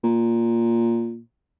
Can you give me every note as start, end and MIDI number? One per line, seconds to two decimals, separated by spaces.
0.04 1.20 46